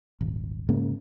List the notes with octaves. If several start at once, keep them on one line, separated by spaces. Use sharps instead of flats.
D#1 G#1
G#2 C#3 A#3